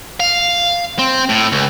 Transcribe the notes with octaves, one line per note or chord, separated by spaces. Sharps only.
F5
C4
A2
C#2